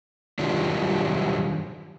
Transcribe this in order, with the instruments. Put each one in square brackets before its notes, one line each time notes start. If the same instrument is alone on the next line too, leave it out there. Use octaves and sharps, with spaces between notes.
[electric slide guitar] D#3 F#3 G3 D4 F4